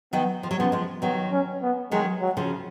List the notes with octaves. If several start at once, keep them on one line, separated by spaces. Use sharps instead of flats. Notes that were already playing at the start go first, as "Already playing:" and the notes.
D#3 F#3 B3
F3
F#3
C#3 F3 B3
F3 G#3
D#3 F#3 B3
C#4
B3
D#3 F#3 G#3
F#3
C#3 F3